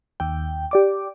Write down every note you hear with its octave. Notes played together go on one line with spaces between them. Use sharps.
D#2 G5
G4 D5 D6